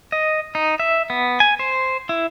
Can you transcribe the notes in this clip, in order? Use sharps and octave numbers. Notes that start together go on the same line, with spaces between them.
D#5
D#4
E5
B3
G#5
C5
E4